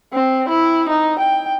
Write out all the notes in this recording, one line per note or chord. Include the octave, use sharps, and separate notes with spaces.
C4
E4
D#4
G5